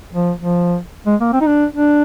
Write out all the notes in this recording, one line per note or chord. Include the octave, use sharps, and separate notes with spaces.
F3
F3
G#3
A#3
C4
D#4
D4
D4